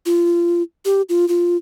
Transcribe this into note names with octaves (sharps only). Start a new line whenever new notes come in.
F4
G4
F4
F4